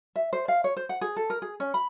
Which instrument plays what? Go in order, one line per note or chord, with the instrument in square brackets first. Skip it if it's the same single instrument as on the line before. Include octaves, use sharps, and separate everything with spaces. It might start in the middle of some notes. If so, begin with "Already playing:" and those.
[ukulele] E5
C5
F5
C#5
C5
F#5
G#4
A4
A#4
G#4
C#4
B5